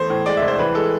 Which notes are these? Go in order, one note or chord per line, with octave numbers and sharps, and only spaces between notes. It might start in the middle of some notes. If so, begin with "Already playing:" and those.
Already playing: E2 A3 C5
A2
G#3 D5
E5
C2
C5
E3 B4
G#3 A4